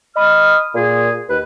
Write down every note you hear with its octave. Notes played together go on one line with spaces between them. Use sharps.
D#5 B5 D#6 F6
A#2 G#4
D#2 B4